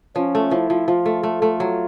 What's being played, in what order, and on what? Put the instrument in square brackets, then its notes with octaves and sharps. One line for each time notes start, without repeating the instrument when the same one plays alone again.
[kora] F3 [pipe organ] C#4
[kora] A3
[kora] F3 [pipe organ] E4
[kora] F3
[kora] F3 [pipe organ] F4
[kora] A3
A3
A3
F#3